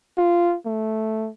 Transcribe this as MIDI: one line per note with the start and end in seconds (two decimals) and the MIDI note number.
0.18 0.56 65
0.66 1.29 57